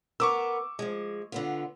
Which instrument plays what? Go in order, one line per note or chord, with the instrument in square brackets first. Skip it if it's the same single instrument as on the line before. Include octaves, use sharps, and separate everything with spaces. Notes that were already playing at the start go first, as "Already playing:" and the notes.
[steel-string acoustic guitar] B3 A#4 [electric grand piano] C#6 D6 E6
[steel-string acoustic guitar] F3 G#3
D3 B3 F4